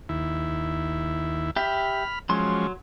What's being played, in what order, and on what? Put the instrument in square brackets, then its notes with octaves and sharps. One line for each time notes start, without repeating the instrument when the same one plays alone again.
[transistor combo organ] D#2 E4
[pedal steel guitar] G4 E5 [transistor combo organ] B5 F6
[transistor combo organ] F3 G#3 C#4 [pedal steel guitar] F#3 C6